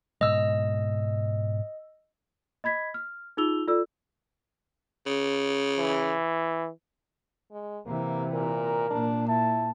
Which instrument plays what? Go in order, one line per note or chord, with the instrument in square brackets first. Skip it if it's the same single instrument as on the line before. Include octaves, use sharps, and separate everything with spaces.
[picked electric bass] G#2 B2 G#3 [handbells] D#5 E6
[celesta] D#5 B5 G#6 B6
F6
D#4 F4 G#4 E6 F7 G7
F4 A4 D5 E6
[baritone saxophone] C#3
[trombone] E3
[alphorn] G#3
[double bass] C3 E3 [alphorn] A#3
[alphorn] A#2 [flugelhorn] A#4
[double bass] A#2 [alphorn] D4
[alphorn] E4 [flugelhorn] A5